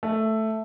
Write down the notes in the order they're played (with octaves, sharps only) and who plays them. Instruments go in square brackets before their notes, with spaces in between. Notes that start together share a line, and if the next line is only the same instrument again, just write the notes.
[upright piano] A3